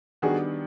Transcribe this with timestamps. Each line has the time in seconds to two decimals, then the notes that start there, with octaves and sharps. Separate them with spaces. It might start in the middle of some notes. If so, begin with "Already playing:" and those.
0.22 D#3 G3 B3 D4 F#4 G#4